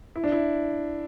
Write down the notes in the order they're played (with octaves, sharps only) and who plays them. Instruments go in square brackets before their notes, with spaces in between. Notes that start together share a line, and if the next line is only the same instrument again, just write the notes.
[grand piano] E4
D4
E4